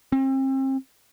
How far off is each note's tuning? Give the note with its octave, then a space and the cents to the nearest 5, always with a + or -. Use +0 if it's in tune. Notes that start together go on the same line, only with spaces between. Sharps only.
C4 +35